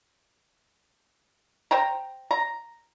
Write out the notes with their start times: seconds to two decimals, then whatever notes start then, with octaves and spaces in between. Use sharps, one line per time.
1.71 C5 G5 A#5
2.31 A#5